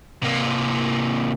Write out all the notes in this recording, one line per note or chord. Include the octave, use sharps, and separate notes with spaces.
C3 A#3